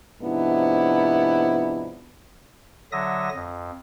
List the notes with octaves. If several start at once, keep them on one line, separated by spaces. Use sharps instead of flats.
G#2 C3 F3 B3 D4 E4
D3 F#3 E5 D#6 A#6
F2